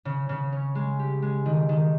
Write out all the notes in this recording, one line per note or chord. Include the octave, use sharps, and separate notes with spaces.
C#3
C#3
C#4
G#3
G4
G#3
D#3
D#3